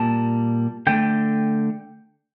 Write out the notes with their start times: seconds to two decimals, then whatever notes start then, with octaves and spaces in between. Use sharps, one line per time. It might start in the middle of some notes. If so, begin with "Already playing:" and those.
Already playing: A#2 G3 A#3 A5
0.87 D3 A3 G5